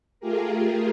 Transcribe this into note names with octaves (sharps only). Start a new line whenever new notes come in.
A3 F4 G4 G#4 A#4